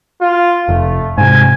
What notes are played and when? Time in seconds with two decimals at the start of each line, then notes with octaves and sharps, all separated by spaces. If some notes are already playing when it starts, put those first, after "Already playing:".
0.21 F4
0.69 F1 A3
1.18 G#2 C3 G#5